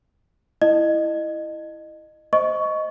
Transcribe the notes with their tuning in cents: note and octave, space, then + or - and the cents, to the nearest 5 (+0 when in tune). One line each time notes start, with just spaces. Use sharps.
E4 +0 D#5 -25
C5 +0 D#5 +0 C#6 +10